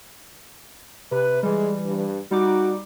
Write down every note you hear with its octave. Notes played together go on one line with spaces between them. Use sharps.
C3 B4
E3 G3 G#3
G2
G3 D#4 F#4 D6